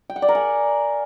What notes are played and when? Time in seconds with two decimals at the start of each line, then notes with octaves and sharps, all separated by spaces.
0.10 G5
0.16 F#5
0.22 D5
0.29 A#4
0.35 G#5